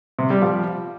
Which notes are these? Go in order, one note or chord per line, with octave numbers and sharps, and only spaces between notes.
C3
G3
F3